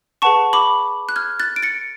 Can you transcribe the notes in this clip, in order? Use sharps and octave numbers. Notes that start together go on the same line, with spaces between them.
G#4 B4 F#5 A5 C#6
B5 D6
F#6
F6 G#6
F#6 A6
D7
A6 C#7